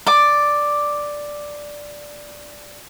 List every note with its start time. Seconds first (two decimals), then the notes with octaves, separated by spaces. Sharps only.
0.07 D5 D6